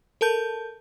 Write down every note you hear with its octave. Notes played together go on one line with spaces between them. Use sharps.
A4 A#4 A5 G6